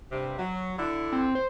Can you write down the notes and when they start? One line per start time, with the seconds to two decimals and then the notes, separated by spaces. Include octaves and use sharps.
0.12 G2 C3
0.38 F#3
0.77 D3 E4
1.12 C4
1.35 C5